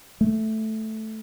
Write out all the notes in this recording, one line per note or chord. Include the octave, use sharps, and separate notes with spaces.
A3